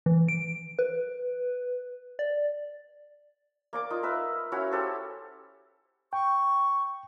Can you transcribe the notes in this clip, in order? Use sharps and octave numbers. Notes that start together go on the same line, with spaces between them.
E3
D7
B4
D5
A#3 D5 D6
D#4 F4
A#4 B4 E5
C#4 E4 F#4 F5
G4 A4 C5
G5 C#6